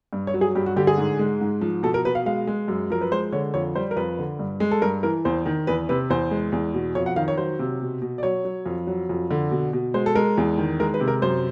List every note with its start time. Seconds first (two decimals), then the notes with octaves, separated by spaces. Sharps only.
0.13 G2
0.27 C#5
0.34 F#3
0.41 G#4
0.55 G2 G4
0.66 F#4
0.76 D3 G4
0.87 G#4
0.98 G#2
1.19 G#3
1.41 G#2
1.61 F3
1.83 B2 A4
1.94 A#4
2.05 B2 B4
2.15 F5
2.26 G#3 F5
2.47 G#3
2.68 F#2
2.90 F3 A#4
3.01 B4
3.11 G#3 C5
3.33 D3 C#5
3.54 F2 C#5
3.75 G3 C5
3.91 A#4
3.96 F2 B4
4.19 D3
4.39 G2
4.60 G#3
4.71 A4
4.82 G2 A#4
5.03 E3 A#4
5.25 E2 C5
5.46 D#3
5.67 E2 B4
5.89 C3 B4
6.10 E2 C5
6.31 G#3
6.52 E2
6.74 B2
6.95 F2 C#5
7.06 F#5
7.16 D#3 F5
7.28 C#5
7.38 F#3 C5
7.59 C3
7.81 B2
8.02 B2
8.18 D5
8.23 F#3 C#5
8.45 F#3
8.66 F2
8.87 F#3
9.09 F2
9.31 D3
9.51 B2
9.73 B2
9.94 G#3 C5
10.06 A4
10.15 G#3 A#4
10.38 E2
10.58 D#3
10.80 G#3 A#4
10.94 B4
11.00 C3
11.08 A#4
11.22 F#2 C5